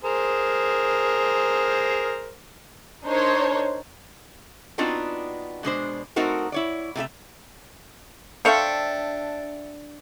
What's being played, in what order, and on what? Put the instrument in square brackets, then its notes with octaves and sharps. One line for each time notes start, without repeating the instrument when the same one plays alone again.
[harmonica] G#4 A#4 C5
[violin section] D4 D#4 A#4 C5 C#5
[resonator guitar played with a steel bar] B3 C4 D4 D#4 F4 F#4
B2 G#3 D4 C5
A3 C4 D#4 F#4 A#4 C5
E4 C#5 D5
C3 A3 G4 E5
[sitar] D4 [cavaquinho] A4 E5 G5 [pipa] C5 F5 C#6